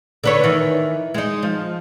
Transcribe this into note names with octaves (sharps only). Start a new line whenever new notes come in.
D3 B4 C#5
D#3 E3
G#3 D#4
F3